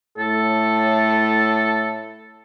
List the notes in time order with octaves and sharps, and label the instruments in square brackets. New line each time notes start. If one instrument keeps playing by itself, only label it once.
[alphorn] A2 [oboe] A4